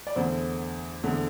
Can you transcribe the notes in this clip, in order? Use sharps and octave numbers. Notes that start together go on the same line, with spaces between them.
D5
E2 D3 A3 C5
E2 D3 A3